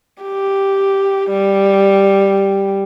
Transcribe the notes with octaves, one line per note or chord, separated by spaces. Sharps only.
G4
G3